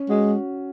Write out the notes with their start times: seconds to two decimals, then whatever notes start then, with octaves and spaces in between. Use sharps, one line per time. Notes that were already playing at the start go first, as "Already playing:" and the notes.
Already playing: C#4
0.09 G#3 F#4